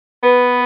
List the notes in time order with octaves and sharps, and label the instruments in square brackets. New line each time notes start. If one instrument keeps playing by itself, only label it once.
[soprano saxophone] B3 [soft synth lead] B4